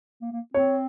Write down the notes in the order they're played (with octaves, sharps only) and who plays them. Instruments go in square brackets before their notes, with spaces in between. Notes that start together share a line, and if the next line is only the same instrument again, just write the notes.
[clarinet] A#3
A#3
[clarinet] C4 [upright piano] C#5